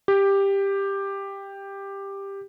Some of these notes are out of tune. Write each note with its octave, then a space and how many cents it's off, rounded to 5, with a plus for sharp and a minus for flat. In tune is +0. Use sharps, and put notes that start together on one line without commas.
G4 +10